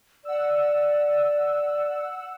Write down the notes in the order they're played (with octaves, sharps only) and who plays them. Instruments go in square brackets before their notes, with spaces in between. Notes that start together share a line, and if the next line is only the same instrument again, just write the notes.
[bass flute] D5 [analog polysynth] F#5 E6